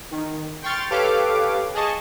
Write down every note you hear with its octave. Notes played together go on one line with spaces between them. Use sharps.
D#3
G5 C6 C#6 F6 A6
G4 A4 B4 C#5 F5 D6
G#4 D#5 A5 C#6